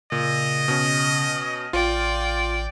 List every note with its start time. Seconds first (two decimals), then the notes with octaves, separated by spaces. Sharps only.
0.12 A#2 C#3 D#5
0.68 B2 C#4
1.73 A1 F4 D5 G5